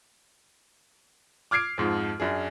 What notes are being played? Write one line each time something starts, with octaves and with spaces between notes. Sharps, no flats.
D6 F6 G#6 C7 D7
F2 G#2 F3
F#2 D4 G#4